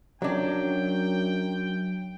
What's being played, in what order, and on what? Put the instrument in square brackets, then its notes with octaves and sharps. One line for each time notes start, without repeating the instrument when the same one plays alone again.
[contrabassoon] F#2 [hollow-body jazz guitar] F#3 D4 [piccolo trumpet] G5